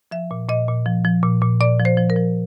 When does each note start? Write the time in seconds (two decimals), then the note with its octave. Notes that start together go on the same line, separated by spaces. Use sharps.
0.11 F3 E5
0.31 A#2
0.49 A#2 D#5
0.68 A#2
0.86 F3
1.04 F3
1.23 A#2
1.41 A#2
1.60 A#2 D5
1.80 F3
1.85 C5
1.97 F3
2.10 A#4
2.16 F3